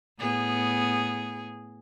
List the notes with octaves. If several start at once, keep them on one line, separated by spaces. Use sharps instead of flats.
A2 B3 G#4